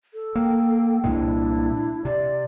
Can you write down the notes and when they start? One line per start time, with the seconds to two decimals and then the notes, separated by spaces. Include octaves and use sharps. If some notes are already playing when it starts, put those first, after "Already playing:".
0.14 A4
0.35 A#3 G5
1.04 C2 A#2 G#3 D4 E4
2.05 C3 D5